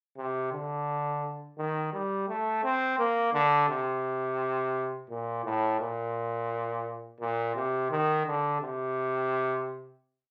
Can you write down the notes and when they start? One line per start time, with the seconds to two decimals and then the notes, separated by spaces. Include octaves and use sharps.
0.17 C3
0.52 D3
1.58 D#3
1.93 G3
2.28 A3
2.64 C4
2.99 A#3
3.33 D3
3.69 C3
5.10 A#2
5.44 A2
5.80 A#2
7.20 A#2
7.56 C3
7.91 D#3
8.26 D3
8.61 C3